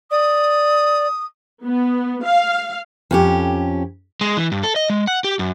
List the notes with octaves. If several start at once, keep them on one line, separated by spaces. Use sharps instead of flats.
D5 D#6
B3
F5
F2 C#4 G4
G#3
E3
G2
A4
D#5
G#3
F#5
G4
F#2